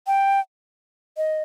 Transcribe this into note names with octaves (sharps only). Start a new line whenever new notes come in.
G5
D#5